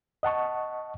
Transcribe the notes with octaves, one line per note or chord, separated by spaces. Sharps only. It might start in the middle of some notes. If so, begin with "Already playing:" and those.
D#5 F#5 A5 C#6